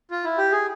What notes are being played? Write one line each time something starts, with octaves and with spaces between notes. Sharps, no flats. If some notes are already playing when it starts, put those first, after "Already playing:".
F4
E4
G4
G#4